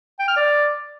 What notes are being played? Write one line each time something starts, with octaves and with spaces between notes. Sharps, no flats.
G5
F6
D5